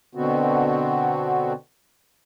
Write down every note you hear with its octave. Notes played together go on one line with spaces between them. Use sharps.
B2 D3 B3 C4 F#4